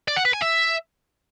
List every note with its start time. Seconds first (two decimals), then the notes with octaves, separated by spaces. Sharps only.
0.08 D5
0.17 F#5
0.25 B4
0.34 G#5
0.42 E5